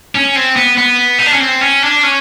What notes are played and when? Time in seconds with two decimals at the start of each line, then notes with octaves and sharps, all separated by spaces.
0.15 C#4
0.36 C4
0.56 B3
0.77 B3
1.19 D#4
1.26 D4
1.33 C#4
1.40 C4
1.61 C#4
1.83 D4
2.03 C#4